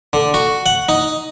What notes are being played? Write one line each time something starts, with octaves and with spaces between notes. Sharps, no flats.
D3
F#4
F#5
D#4